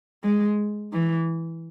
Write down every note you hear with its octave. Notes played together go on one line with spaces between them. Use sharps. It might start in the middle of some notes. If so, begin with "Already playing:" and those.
G#3
E3